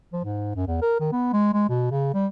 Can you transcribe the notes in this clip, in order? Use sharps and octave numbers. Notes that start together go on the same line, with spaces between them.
F3
G#2
F#2
E2
A#4
D#3
B3
G#3
G#3
B2
C#3
G3